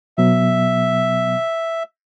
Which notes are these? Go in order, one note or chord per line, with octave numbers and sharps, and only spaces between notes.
B2 F#3 B3 E5